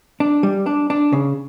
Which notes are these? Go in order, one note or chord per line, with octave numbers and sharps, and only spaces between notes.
D4
G3
D4
D4
C#3